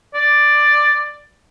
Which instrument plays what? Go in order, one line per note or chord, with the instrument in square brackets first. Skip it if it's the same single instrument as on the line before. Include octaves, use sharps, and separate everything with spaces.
[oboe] D5